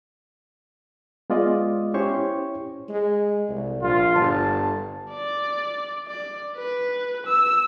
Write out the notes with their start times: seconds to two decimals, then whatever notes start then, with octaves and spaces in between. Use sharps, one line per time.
1.30 G#3 B3 F4 D5 D#5
1.94 C#4 E4 G4 C5 C#5 C#6
2.89 G#3
3.49 C2
3.82 A#1 F4
4.15 G1 A5
5.10 D5
6.07 D5
6.56 B4
7.27 E6